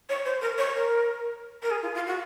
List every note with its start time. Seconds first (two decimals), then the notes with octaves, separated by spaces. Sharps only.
0.09 C#5
0.25 C5
0.41 A#4
0.57 C#5
0.73 A#4
1.62 A#4
1.70 G#4
1.82 F4
1.94 F4
2.06 F#4